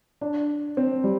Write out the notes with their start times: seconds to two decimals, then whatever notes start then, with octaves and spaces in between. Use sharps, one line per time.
0.21 D4
0.77 C4
1.04 G3